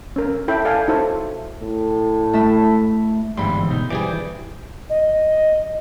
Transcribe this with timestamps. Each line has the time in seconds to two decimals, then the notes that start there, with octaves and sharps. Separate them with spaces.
0.16 C#4 A#4
0.48 E4 A4 C#5 E5 G5 B5
0.65 A4 D5 F5 G#5
0.88 D#4 E4 F#4 A4 C5 C#5
1.62 A2
2.33 A3 E4 E5
3.37 G1 G#2 E3 G3 B5 C6
3.68 B2 D#4
3.91 E3 G3 G#4 C5 D5
4.90 D#5